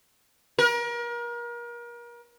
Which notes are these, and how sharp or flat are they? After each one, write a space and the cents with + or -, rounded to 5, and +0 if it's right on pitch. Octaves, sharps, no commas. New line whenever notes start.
A#4 +35